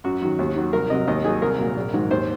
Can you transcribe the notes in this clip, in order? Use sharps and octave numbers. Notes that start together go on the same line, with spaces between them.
F#2 F#4
D#3 F#3
D#2
D#3 F#3
C2 A#4
C3 F#3 D#5
D#2 D#5
D#3 F#3 G#4
C2 A#4
A#2 F#3
A#1
G#2 D#3 F#3
D#2 C5